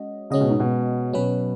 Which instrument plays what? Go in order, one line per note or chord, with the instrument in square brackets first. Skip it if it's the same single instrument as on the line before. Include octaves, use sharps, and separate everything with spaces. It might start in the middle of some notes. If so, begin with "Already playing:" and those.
Already playing: [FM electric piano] G#3 C#4 F#4 D#5
[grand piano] C#3 [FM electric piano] G#3 C#4 F#4 D#5
[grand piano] B2
G#2
B2
[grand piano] B2 [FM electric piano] F#3 C#4 B4